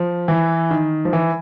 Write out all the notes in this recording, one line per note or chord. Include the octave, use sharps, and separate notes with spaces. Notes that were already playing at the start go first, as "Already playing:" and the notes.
Already playing: F3
E3
D#3
F3
E3